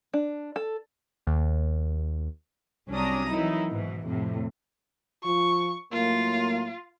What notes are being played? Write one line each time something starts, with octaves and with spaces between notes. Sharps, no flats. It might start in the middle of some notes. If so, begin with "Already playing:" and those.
D4
A4
D#2
C2 F#3 C#4 D4 A#5 D#6
D#3 E3 F#3 D#4 E4
G#2 B2 E3
F2 A2 C3
F3 F4 C#6
A2 F#3 A#3 F4